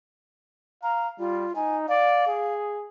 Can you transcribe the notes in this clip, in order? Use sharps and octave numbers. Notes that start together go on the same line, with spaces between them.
F5 A#5
G3 F4
D#4 G#5
D5 F5
G#4